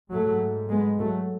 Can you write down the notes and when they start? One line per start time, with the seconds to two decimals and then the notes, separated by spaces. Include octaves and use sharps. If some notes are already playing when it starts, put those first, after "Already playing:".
0.12 G#2 F#3 A3
0.70 G#3 B3
0.99 F#3 A3